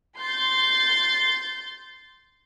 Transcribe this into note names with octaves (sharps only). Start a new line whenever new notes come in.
C6 G6 A6